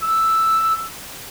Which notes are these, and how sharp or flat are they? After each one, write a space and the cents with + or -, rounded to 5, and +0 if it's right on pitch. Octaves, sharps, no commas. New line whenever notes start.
E6 +0